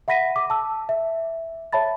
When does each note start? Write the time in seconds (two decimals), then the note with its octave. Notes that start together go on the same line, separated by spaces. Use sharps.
0.08 E5 F#5 B5 A#6 B6 D#7
0.36 D6
0.50 A5 E6
0.89 E5
1.73 C#5 E5 A5 B5 A6